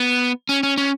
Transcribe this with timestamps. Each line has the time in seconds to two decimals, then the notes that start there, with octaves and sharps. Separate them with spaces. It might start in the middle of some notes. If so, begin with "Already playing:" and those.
Already playing: B3
0.49 C#4
0.63 C#4
0.78 C#4